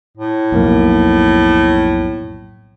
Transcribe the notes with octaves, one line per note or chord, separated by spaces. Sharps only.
A2
B1 F2 A#3